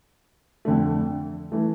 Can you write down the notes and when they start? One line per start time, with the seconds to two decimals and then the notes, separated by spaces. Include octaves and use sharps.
0.65 F2 D3 A3
1.52 E3 A3